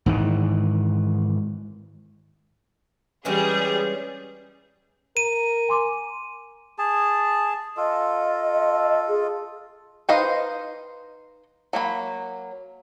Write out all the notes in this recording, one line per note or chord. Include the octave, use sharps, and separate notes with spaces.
G#2 D#3 E3
E3 G3 G#3 C#4 G#4
A#4 D#7
G#5 C6 D6
G#4 A5
F4 A4 D#5
G#4
D#4 B4 C5 D#5 F5
F#3 A#3 B5